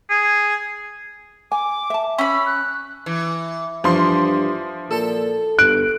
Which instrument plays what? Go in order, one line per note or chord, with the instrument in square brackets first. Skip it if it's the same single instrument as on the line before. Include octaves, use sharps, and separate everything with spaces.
[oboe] G#4
[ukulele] G#5 [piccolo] D6
[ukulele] E5 A5
[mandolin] C#4 B5 [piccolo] E6
[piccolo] F#6
[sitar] E3
[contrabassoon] G2 [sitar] E3 [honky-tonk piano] F3 C6
[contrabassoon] A#2 [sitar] A4
[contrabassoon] G1 [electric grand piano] F#6 D7